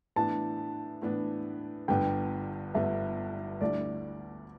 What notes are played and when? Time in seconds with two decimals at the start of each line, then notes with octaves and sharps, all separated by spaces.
0.16 A2 E3 B3 D4 A5
1.02 A2 E3 B3 D4
1.88 G1 G2 D3 B3 G5
2.74 G1 G2 D3 B3 E5
3.61 D2 D3 G3 E4 D5